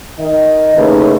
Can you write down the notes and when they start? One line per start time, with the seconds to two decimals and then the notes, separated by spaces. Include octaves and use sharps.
0.19 D#3 D#5
0.76 D#2 C#3 A3 D#4 E4 B4